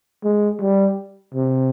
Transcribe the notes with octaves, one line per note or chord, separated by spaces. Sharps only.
G#3
G3
C3